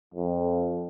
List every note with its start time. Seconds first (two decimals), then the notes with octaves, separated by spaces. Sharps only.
0.14 F2